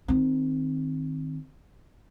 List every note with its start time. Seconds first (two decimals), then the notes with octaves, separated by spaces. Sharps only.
0.08 D#3 C4